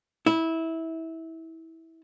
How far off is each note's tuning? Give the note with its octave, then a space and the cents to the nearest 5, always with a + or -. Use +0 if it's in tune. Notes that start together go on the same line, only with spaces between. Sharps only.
E4 -20